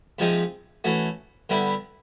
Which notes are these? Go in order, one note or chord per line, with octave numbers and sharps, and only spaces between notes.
C3 F3 G#3 C4 D#4
E3 A3 C#4 F#4
D3 G3 B3 E4